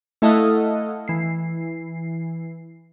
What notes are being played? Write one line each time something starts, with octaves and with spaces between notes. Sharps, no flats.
A3 E4 A4 D#5 F5 F#5
E3 C7